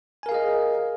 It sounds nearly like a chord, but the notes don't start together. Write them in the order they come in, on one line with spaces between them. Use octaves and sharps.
G#5 A#4 F5 G#4 D#5